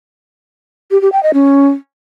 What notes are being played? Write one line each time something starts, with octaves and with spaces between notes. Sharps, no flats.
G4
G4
G5
D#5
C#4